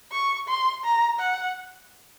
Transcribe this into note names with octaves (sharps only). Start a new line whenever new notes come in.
C#6
C6
A#5
F#5